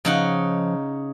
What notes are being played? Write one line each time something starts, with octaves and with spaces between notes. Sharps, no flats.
C#3 F3 D#4 F#5